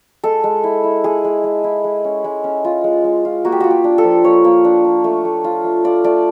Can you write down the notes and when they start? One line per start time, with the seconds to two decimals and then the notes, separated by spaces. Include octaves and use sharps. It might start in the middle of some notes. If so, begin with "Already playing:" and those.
0.24 G#3 A4
0.44 G#3
0.64 E4
0.84 E4
1.04 G#3 G#4
1.24 G#3
1.44 G#3
1.64 E4
1.84 G#3
2.04 C#4
2.24 G#3
2.44 C#4
2.65 F4
2.84 G#3
3.04 G#3
3.25 F4
3.45 A#3 F#4
3.52 G4
3.60 F4 F#4
3.71 G4
3.84 D4
3.98 A4
4.04 F3
4.24 A#3 C#5
4.44 A#3
4.65 D4
4.84 D4
5.04 A3
5.25 A3
5.44 F4
5.64 A3
5.84 F4 D5
6.04 A3 D5